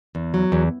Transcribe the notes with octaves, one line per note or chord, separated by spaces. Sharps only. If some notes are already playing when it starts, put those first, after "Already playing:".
E2
F#3
E2